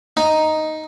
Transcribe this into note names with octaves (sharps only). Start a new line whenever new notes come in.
D#4